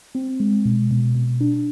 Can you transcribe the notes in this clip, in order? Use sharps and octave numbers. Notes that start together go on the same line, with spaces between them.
C4
G#3
B2
B2
B2
D4